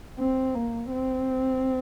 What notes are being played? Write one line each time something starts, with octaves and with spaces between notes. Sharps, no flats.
C4
A#3
C4